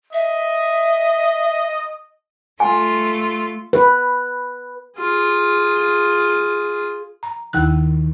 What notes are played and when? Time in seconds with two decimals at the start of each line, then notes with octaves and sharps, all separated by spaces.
0.13 D#5 E5
2.60 A3 F4 G#5
3.73 B4
4.98 F4 G#4
7.23 A#5
7.53 D#2 D#3 E4 F#6